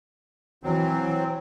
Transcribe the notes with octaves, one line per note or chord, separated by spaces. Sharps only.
E3 F#3 C4